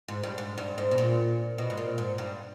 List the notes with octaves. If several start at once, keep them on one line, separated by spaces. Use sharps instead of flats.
G#2
G2
G#2
G2
G#2
B2
A#2
B2
G#2
A#2
G#2
G2